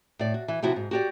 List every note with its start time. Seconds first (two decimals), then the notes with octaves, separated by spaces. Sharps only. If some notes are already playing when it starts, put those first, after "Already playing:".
0.19 A2 D5
0.34 F#4
0.48 E3
0.63 C3 F3 E4 F#4
0.76 G#2
0.91 F#4 G4 D5